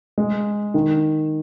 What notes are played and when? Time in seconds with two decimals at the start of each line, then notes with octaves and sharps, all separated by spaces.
0.18 G#3
0.74 D#3